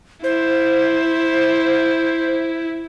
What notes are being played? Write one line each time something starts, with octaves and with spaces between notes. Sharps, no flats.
E4 C5